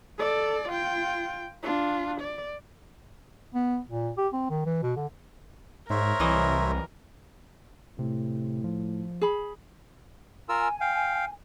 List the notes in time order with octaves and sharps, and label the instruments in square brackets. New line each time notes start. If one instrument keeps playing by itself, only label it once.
[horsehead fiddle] A4 D5
F4 G5
D4 F4
D5
[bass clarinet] B3
A#2
G4
C4
D#3
E3
B2
D3
[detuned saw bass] G#2 [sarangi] A#4 [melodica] C5 C#5 E5
[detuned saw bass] C2 [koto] E3 F#3 D#5
[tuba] A2 [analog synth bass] C3
[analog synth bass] F3
[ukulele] G#4 B5
[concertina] F4 A#4 E6 [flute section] G#5
[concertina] F5 G5